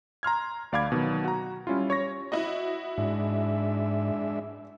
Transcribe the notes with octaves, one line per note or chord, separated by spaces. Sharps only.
A#5 C6 F6 G#6
D2 D5 F5 B5 D6 G#6
B2 D#3 F#3
F#4 A#5
G3 C#4 E4 F4
C#5 C#6 A#6
E4 F#4 D#5
G#2 G#3 D4 E5